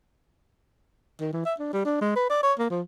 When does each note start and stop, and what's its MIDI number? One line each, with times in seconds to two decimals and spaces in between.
1.20 1.30 51
1.33 1.43 52
1.45 1.54 76
1.59 1.68 62
1.73 1.81 55
1.85 2.00 62
2.01 2.11 56
2.16 2.28 71
2.30 2.39 74
2.43 2.53 73
2.59 2.68 58
2.70 2.81 53